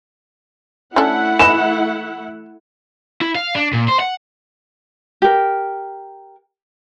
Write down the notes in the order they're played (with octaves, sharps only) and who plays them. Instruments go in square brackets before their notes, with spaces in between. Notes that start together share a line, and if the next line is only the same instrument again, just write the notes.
[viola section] A3 E4 F#5 [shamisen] C#4 D4 A4
[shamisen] E3 B4 D#5 [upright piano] E7
[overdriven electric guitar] E4
F5
D4
A#2
C5
F#5
[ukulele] G4 A#4